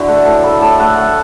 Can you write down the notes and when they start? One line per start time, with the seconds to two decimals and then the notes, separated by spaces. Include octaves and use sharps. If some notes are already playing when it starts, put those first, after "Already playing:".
Already playing: D3 E4 F#4
0.08 A3 F#5
0.25 A2 A5
0.43 A3 B5
0.61 A2 A5
0.80 A3 F#5
0.97 A3 F#5